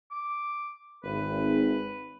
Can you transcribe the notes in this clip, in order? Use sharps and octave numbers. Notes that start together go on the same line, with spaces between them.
D6
G#1 B4